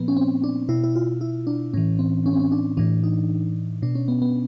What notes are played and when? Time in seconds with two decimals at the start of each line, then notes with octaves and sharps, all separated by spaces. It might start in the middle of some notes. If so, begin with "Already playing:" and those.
Already playing: A#2 F3 A#3 B3
0.08 C#4
0.17 C4
0.44 D4
0.69 B2 E4
0.84 E4
0.96 F4
1.21 E4
1.47 D4
1.73 A2 E3 C#4
1.99 C4
2.26 C#4
2.33 C4
2.39 C#4
2.52 D4
2.77 A2 E3 D4
3.04 D#4
3.82 B2 D4
3.95 C#4
4.08 B3
4.22 B3